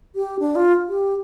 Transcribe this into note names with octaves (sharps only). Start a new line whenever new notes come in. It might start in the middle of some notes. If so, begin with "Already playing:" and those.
G4
D4
F4
G4